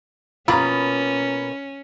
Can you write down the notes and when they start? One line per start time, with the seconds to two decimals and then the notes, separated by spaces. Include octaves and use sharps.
0.48 B2 A#3 C#4 F4 A#5 B5